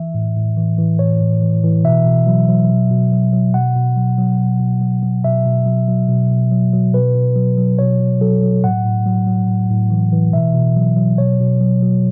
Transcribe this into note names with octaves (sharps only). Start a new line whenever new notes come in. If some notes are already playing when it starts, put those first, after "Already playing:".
Already playing: E3 E5
A2
A2
E3
E3
A2 C#5
A2
E3
E3
B2 E5
B2
F#3
F#3
B2
B2
F#3
F#3
B2 F#5
B2
F#3
F#3
B2
B2
F#3
F#3
B2 E5
B2
F#3
F#3
B2
B2
F#3
F#3
B2 B4
B2
F#3
F#3
B2 C#5
B2
F#3 A4
F#3
A2 F#5
A2
F#3
F#3
A2
A2
E3
E3
B2 E5
B2
F#3
F#3
B2 C#5
B2
F#3
F#3